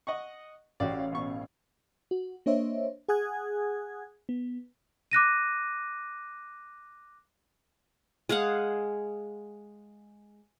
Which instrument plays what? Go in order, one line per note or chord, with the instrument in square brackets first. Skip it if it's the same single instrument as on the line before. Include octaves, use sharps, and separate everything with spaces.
[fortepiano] D#5 F#5 C#6
[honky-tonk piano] A1 C#5 F5 [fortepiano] F#4 G4 D5
[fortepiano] B2 C#6
[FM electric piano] F#4
A#3 D4 C5 C#5 D#5 E5
G#4 F#5 G#5 D#6 F#6 G#6
B3
[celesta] D6 F#6 A#6 D#7
[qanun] G#3 G#4 F5 F#5